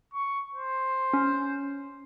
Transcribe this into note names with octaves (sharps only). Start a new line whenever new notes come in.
C#6
C5
C#4